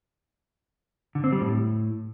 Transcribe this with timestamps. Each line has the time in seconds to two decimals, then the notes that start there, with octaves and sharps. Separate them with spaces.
1.15 D3
1.24 C4
1.32 G3
1.41 A2